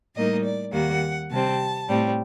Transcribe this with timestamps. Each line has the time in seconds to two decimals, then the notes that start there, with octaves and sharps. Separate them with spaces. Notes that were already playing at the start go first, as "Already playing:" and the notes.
0.15 A2 G3 A#3 D#4 D#5
0.44 D5
0.72 D#2 D#3 G3 A#3 F#5
1.30 C3 G3 C4 A5
1.88 A2 G3 C4